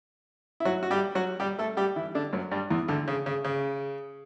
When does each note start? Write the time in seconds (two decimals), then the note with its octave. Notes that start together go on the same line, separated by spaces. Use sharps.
0.60 E4
0.65 F#3 F#4
0.83 F#4
0.91 G3 G4
1.15 F#3 F#4
1.40 G3 G4
1.59 A3 A4
1.77 G3 G4
1.96 E3 E4
2.15 D3 D4
2.33 F#2 F#3
2.51 G2 G3
2.70 E2 E3
2.88 D2 D3
3.08 C#3
3.26 C#3
3.45 C#3